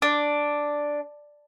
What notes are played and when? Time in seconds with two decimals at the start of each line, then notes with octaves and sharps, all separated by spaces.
0.02 D4